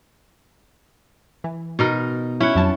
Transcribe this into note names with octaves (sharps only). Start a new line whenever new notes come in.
E3
B2 D#4 A#4
C#4 E4 F#5
F2 F#3 A5